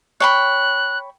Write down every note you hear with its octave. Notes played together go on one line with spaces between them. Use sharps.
C#5 G5 B5 F#6